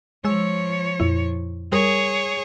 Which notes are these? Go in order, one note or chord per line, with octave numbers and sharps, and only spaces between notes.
F3 G#3 C#5 E6
F2 A#2 E4
G3 G#4 A#4 C#5 D#6